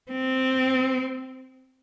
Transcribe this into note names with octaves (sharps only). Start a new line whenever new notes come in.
C4